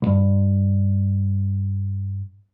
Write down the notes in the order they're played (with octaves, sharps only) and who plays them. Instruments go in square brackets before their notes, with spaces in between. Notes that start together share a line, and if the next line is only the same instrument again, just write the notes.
[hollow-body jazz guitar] C2 G2